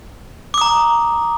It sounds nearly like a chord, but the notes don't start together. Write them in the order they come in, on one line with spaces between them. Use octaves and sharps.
D6 D#6 A#5